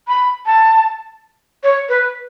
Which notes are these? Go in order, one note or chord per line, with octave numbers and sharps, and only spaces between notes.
B5
A5
C#5
B4